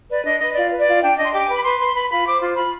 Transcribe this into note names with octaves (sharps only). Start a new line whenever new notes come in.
B4 D5
D4 D#5
B4 D#5
F4 D5
B4
D5
F4
D4 G5
D4 D#5
C6
G4 D6
G#5
B4
B5
B4 C6
B4 C6
B4 B5
F4 B5
C5 D6
F4
F4 B5